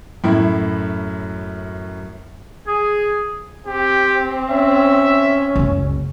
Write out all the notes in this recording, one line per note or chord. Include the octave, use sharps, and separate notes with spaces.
F#2 A2 E4
G#4
C4 G4
C#4 E5
F#1 C#2